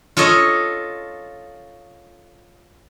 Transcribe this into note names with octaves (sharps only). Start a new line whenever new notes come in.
F4 A4 C#5 D#5